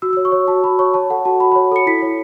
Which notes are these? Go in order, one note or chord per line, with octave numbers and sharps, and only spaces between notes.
F#4 E6
C#5 E6
C#6
C#5
F#4 A5
F#4 B5
C#5 C#6
C#5 A5
A4 F#5
F#4 A5
F#4 B5
B5
C#5
A4 C#7
E4 B6
C#5